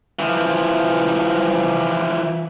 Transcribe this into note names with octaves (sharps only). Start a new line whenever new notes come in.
E3 F3